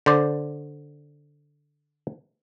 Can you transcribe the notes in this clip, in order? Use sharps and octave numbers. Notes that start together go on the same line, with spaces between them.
D3 C5 D5